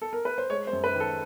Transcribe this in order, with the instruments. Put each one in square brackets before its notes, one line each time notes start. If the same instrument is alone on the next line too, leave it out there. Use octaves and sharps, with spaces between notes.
[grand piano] A4
A#4
B4
C5
G#3 C#5
C5
F#2
B4
D#3
A4